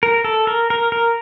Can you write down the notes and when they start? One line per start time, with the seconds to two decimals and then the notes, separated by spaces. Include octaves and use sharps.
0.03 A#4
0.24 A4
0.47 A#4
0.70 A#4
0.92 A#4